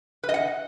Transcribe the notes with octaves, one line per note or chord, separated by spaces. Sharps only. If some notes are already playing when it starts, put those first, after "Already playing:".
B4
D#5
F#5